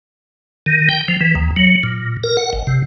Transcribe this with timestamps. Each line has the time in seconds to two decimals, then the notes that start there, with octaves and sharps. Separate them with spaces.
0.66 D#3
0.89 G5
1.08 F3
1.21 E3
1.35 D#2
1.56 F#3
1.83 A#2
2.24 A#4
2.37 F#5
2.53 G#1
2.67 C3